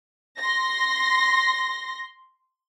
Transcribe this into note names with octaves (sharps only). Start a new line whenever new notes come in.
C6 A#6